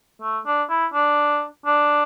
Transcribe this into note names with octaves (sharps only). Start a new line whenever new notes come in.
A3
D4
E4
D4
D4